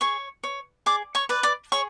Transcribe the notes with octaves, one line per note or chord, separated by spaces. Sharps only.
G#4 C#5 C#6
C#5
G#4 D5 D6
C#5 C#6
B4 D5
D5 D6
G#4 C#5 C#6